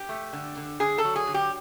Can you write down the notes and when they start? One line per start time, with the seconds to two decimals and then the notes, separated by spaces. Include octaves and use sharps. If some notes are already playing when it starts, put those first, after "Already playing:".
Already playing: G4
0.09 A3
0.33 D3
0.57 D3
0.80 D3 G#4
0.98 A4
1.05 F#3
1.16 G#4
1.28 D3
1.34 G4